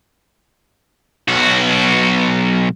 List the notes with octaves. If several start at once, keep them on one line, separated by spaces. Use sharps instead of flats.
B1 F#4